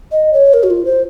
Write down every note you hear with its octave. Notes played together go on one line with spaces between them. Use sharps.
D#5
C#5
A#4
F#4
F4
C5